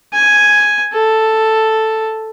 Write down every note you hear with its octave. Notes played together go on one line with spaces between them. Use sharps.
G#5
A4